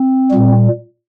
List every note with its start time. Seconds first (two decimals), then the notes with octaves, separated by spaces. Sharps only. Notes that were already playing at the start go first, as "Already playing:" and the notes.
Already playing: C4
0.31 A#2 G3